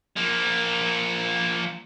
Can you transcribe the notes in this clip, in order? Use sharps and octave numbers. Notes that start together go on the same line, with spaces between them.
F3 A#3